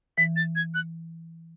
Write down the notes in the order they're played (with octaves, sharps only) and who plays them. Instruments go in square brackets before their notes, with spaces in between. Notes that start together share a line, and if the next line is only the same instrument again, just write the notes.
[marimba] E3 [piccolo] B6
[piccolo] A6
G#6
F#6